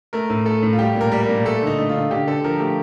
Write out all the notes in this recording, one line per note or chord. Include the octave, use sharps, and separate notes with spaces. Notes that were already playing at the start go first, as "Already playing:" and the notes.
A3 A#4
A2
A3 A4
A2
F4
G3 G4
A#2
A#4
G3
A#4
A#2
A3 A4
D3 D#4
A3
F4
D3
D3 G4
D3 A4
F3 A#4
A3 G4